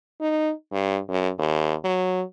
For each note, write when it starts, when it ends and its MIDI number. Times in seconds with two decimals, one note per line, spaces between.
0.21 0.52 63
0.72 0.99 43
1.09 1.29 42
1.38 1.74 39
1.84 2.22 54